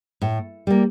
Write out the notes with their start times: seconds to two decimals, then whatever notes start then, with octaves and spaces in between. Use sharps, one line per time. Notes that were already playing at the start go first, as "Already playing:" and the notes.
0.22 A2
0.67 G3 A#3